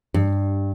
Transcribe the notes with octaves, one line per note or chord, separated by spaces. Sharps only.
G2